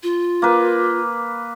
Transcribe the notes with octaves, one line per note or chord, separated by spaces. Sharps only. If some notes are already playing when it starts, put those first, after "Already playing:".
F4
A#3 B4